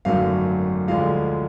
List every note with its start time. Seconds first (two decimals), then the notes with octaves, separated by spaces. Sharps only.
0.05 G#1 F#2 D3 F#3 A3 F5
0.88 D2 D3 F3 G#3 F5